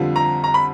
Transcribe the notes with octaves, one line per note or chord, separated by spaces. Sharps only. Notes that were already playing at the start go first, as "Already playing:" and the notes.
Already playing: F2 D3 G3 C4 F4
A#5
A#5
B5